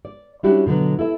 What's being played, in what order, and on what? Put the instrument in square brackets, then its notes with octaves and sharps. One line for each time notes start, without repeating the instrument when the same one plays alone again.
[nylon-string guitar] D5
G3 C#4 D4 E4 F#4 G4
B2 D3 E3 F#3 B3
E4 A4 E5